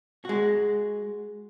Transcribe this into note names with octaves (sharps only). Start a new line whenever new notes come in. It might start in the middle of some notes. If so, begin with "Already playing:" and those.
G#3 F#4